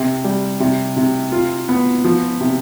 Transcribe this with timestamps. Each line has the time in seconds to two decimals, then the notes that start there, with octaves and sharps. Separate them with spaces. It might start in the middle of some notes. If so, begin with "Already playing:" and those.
Already playing: C3
0.24 G3
0.60 C3
0.97 C3
1.32 F4
1.69 B3
2.04 F3
2.41 C3